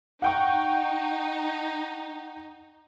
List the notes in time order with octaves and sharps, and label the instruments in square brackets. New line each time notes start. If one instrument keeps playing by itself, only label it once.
[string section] D#4 [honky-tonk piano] F#5 G5 C#6